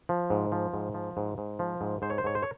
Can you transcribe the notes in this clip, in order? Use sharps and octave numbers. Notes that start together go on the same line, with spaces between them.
F3
G#2
F3
G#2
F3
G#2
G#2
F3
G#2
G#2 C5
C#5
C5
G#2 C#5
C5
C#5